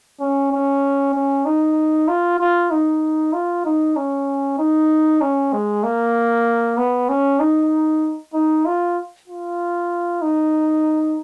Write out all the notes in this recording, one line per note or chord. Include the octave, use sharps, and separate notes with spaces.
C#4
C#4
C#4
D#4
F4
F4
D#4
F4
D#4
C#4
D#4
C#4
G#3
A#3
B3
C#4
D#4
D#4
F4
F4
D#4